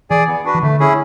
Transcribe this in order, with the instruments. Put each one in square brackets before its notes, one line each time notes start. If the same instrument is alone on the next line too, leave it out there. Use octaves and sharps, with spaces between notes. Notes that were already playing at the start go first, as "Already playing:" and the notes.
[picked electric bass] E3 [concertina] G#4 D5 G#5
[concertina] B3
D4 F#4 B4
[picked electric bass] E3
[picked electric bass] D3 [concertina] A3
[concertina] C#4 E4 G#4